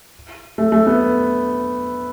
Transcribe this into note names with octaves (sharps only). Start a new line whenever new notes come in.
A3
A3
B3